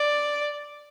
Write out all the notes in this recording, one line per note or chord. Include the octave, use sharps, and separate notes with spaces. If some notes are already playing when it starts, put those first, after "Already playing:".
Already playing: D5